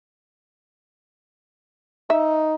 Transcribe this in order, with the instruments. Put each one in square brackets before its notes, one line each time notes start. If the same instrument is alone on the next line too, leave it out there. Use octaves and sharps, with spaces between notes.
[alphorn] D#4 [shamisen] E5